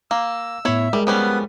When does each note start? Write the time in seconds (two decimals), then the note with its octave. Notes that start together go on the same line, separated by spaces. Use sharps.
0.11 A#3 F5 E6
0.65 A2 B3 E4 C#5 E5
0.93 G3 G#3 G#4 A#4
1.07 F3 G3 B3 C#4 B4